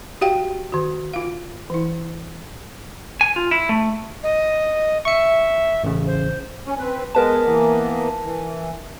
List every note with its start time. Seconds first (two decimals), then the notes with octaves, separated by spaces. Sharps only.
0.21 F#4 G4 F5 G5
0.72 D#3 F#4
1.13 F4 F5
1.70 E3 E4
3.21 G#5
3.36 F4
3.51 E4
3.69 A3
4.23 D#5
5.05 E5 C#6 C#7
5.84 A1 C#3
6.07 C5
6.67 C#4
6.79 C4 B4
7.15 G#3 B3 A#4 B4 A5
7.45 E3 A#3 B3
8.24 E3